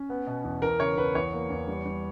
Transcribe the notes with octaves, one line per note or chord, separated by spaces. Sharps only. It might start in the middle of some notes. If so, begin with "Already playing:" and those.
Already playing: C#4
B3
B2
E2
E2 A#4
C#3 C#5
E2 B4
E2 C#5
A#3
E2
G3
G3